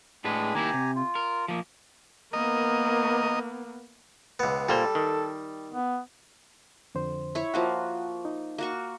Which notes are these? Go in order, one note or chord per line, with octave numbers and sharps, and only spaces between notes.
A2 G#3 D4 G#4 B4
D#3 A#3 E4 G4 G#5 A#5
C3
F4
A#4
F3 A#3
A#3 B3 A#4 D#5
C#2 B3
A#2 G3 A#3 A4 C5
D#3
B3
F2 D3 C5
E4 C#5
F3 A#3 F#4 F#5
D#4
A#3 F#4 C#6